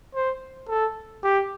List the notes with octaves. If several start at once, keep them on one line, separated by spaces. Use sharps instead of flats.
C5
A4
G4